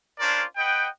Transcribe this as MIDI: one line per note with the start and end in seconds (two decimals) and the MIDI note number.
0.20 0.43 61
0.20 0.43 62
0.20 0.43 65
0.20 0.43 70
0.20 0.43 72
0.20 0.43 74
0.56 0.87 71
0.56 0.87 75
0.56 0.87 78
0.56 0.87 79